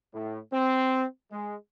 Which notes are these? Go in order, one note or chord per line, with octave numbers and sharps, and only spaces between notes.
A2
C4
G#3